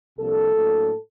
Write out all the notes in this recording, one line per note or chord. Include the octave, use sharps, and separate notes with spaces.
C2 C3 F3 A#3 D4 A4
A2 F#3 A#3 D4